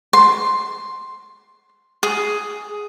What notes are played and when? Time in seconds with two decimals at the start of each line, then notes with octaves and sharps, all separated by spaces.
0.13 C6
2.03 G#4